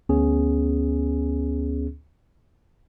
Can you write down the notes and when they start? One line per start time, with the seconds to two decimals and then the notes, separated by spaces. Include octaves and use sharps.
0.09 D2 B3 C#4 G#4